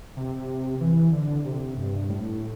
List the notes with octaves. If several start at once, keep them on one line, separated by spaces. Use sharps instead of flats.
C3
E3
D3
C3
G2
A2